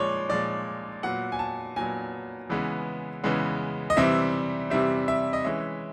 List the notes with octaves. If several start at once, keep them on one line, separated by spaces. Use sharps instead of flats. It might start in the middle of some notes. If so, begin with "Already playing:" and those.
Already playing: A#2 F3 G#3 C#5 D5
A#2 F3 G#3 D5
A#2 F#3 B3 F#5
G#5
A5
A#2 F#3 B3 G#5
C#3 E3 G#3 B3
C#3 E3 G#3 B3
D#5
C3 E3 G3 C4 E5
C3 E3 G3 C4 E5
E5
D#5
E3 G#3 C#4 E5